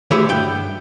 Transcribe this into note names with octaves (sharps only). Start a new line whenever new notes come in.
D2 E3 G4 G#4 C#5 E5
G2 G5